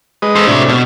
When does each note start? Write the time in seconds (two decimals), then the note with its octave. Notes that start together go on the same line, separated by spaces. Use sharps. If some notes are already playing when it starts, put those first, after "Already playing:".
0.22 G#3 B4 D#5
0.36 A4 C5
0.47 A2 C3 D4 F#4 E5
0.68 B2